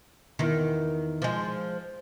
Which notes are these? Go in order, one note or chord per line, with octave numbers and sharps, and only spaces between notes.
E2 D#3
F3 G#3